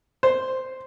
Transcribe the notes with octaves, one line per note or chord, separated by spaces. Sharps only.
C5